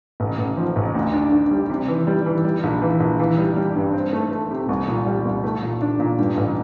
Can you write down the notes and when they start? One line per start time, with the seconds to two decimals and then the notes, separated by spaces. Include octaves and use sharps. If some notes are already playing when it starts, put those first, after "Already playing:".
0.20 A1
0.38 A1
0.57 F3
0.76 A1
0.95 D2
1.13 D4
1.32 D3
1.51 G3
1.70 C3
1.88 E3
2.07 G3
2.26 E3
2.44 G3
2.63 A#1
2.82 E3
3.00 A#1
3.20 E3
3.38 G3
3.56 G3
3.75 G2
3.94 C4
4.13 A3
4.32 A3
4.51 C3
4.69 C2
4.88 A#2
5.06 G3
5.25 C2
5.44 A3
5.62 A#2
5.82 D4
5.99 A#2
6.19 G2
6.37 A1